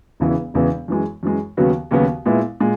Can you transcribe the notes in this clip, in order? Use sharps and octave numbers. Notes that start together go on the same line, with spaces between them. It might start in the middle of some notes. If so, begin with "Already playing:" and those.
E1 E2 C#3 E3 B3
E1 E2 C#3 E3 B3
F#2 E3 G#3
F#2 E3 G#3
D#2 C#3 F#3 B3 F#4
D#2 C#3 F#3 B3 F#4
A#2 G#3 B3 E4
A#2 G#3